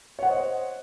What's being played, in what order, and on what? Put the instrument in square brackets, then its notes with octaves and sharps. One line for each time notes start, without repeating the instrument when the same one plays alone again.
[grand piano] C#5
F#5
C5
D#5